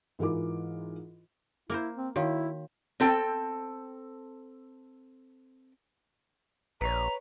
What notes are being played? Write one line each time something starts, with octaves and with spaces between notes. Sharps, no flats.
G#2 E3 F4 A#4 D6
A#3 E4 A#4 C5
C4
D#3 E4 F#4 C#5 F5
C4 A4 G5
A#1 B4 C#5 A#5